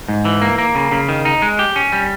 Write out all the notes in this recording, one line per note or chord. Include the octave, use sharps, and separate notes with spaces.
G#2
E3
A#3
A#3
C#3
C#3
D#3
D#4
G#3
G4
C#4
G3